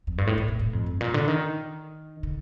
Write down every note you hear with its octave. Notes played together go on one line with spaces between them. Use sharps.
F2
G2
A2
A2
A2
A2
F2
G2
A#2
D3
D#3
D3